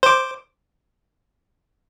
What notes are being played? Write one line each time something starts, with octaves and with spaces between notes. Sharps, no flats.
C5 D6